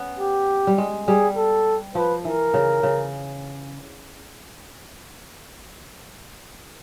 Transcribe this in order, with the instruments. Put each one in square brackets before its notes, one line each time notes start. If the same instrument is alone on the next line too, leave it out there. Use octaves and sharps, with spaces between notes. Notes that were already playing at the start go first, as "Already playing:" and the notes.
Already playing: [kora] B3 C#4
[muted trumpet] G4
[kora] G3
G#3
[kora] G3 [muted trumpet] G#4
[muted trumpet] A4
[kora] F3 [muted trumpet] B4
[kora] E3 [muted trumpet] A#4
[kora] C#3
C#3